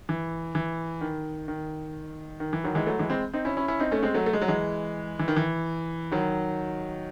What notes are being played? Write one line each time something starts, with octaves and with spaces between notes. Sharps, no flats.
E3
E3
D#3
D#3
D#3
E3
D#3 F#3
E3 G#3
F#3 A3
E3 G#3
G#3 C4
C4 D#4
C#4 E4
C#4 E4
C#4 E4
C4 D#4
A3 C#4
G#3 C4
F#3 A3
A3
G#3
F#3
E3 G#3
E3
D#3
E3
D#3 F#3